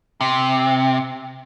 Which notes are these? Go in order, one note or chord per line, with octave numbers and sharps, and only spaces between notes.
C3